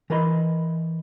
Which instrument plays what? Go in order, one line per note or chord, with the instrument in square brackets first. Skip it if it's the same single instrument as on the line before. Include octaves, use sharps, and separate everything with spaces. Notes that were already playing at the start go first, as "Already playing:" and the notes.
[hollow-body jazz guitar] E3 A#4 B4 D#5 C6